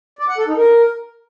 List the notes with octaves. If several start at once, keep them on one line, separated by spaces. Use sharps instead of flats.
D5
F#5
A4
D#4
A#4